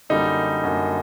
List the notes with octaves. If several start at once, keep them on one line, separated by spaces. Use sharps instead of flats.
F#2 D3 G3 A#3 D#4
F#2 D3 G3 A#3